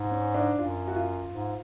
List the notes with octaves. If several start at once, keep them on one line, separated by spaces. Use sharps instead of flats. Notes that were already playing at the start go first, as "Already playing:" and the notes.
Already playing: G#2
C#4
D4
F#2 F4
F#4
F4
G#2